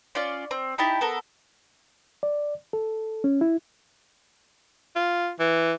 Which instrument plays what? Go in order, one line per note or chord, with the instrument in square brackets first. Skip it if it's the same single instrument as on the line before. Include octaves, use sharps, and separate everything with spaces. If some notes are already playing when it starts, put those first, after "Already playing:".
[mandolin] C#4 F4 D5 F5
C4
D#4 E4 G4 A5
B3 A4 A#4
[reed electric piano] D5
A4
C#4
E4
[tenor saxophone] F4
E3